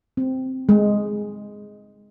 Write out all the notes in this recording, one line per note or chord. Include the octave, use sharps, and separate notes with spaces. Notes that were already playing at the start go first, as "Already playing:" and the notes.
C4
G#3